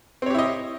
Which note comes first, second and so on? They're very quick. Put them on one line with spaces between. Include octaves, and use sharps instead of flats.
C4 C#5 G4 E4 D#5